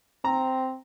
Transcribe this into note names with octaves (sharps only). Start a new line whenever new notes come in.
C4 A#5